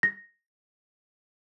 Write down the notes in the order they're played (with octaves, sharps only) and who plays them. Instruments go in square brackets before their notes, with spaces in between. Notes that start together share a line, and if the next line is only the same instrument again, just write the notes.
[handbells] A#6